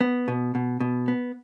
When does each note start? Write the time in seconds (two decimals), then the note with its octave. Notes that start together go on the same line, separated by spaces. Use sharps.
0.01 B3
0.28 B2
0.55 B2
0.80 B2
1.08 B3